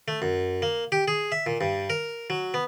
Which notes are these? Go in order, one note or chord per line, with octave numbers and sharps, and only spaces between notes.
A3
F#2
A#3
G4
G#4
E5
A#2
G2
A#4
F#3
B3